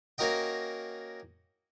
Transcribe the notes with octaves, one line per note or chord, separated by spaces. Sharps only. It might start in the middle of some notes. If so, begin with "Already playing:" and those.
A#3 C#4 F#4 A#4 D#5 G5